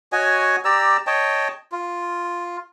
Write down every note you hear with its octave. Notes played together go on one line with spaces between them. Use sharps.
F#4 C#5 D#5 G#5
G4 D5 A#5 E6
C#5 D#5 G5 A5
F4